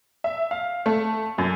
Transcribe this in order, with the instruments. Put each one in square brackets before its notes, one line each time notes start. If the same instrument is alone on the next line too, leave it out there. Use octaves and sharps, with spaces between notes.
[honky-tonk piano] E5
F5
A3
F#2